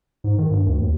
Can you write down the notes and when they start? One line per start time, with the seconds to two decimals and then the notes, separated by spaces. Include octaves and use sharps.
0.24 G#2
0.38 D#3
0.51 G2
0.66 D2
0.81 D#2